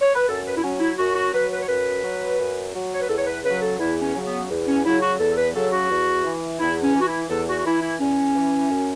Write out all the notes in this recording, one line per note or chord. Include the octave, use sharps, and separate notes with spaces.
C#5
B4
F#2 A4
B4
E4
F#3 C#4
E4
F#2 F#4
F#4
F#3 B4
B4
C#5
F#2 B4
F#3
F#2
F#3
C#5
B4
E2 A4
C#5
B4
C#3 F#3 B4
A4
E2 E4
C#4
C#3 F#3
B3
E2
C#4
C#3 F#3 E4
F#4
E2 A4
B4
C#3 F#3 A4
F#4
E2
E3
E2 E4
C#4
E3
F#4
E4
E2 A4
F#4
F#4
E3 E4
E4
E2 C#4
E3
F#2